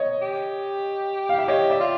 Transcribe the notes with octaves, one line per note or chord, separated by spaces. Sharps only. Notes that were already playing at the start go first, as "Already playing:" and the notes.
Already playing: C#5 D#5
G4
F5
E5
G4 C#5 D#5
D5 E5
F4